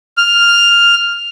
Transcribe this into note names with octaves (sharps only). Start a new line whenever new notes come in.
F6